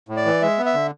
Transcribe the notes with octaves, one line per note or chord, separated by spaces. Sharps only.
A2
D5
E3
G#3 E5
B3
E5
D3